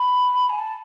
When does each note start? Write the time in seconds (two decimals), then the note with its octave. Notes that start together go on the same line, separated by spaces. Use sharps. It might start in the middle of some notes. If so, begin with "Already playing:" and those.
Already playing: B5
0.49 G#5
0.59 A5